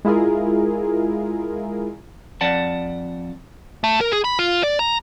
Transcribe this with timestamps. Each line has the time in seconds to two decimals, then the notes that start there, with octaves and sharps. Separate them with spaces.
0.05 G#3 E4 F4 G#4 A#4
2.41 F2 D5 F#5 A5
3.84 A3
4.01 A#4
4.12 G#4
4.24 B5
4.39 F4
4.63 D5
4.79 A#5